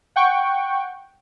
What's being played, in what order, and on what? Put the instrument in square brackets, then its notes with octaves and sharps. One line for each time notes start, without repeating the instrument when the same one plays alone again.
[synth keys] F#5 G5 C#6